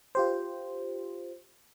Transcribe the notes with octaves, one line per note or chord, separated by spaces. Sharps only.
F4 G4 C5